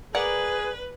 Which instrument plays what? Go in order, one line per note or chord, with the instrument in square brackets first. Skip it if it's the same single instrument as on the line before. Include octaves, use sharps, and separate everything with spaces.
[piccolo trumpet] G#4 [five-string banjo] A#4 D5 F#5 [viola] B4